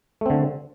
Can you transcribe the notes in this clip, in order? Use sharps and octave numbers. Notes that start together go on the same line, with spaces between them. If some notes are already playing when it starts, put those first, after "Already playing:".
D3 A3 C4